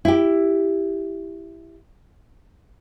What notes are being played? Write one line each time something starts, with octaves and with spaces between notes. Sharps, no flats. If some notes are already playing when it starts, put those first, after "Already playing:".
E4 G4